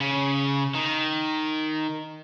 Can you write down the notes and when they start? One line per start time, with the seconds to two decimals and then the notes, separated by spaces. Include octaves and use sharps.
0.01 C#3
0.74 D#3